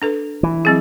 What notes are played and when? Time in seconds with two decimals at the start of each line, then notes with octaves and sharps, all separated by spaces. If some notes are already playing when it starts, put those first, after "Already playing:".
0.02 D4 A4 B4
0.43 E3
0.65 F#3 C4 G#4